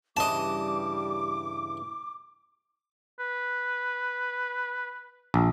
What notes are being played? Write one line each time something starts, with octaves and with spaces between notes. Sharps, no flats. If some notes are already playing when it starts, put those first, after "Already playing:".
G2 C#3 E3 G3 D#5 A5 D6
B4
A#1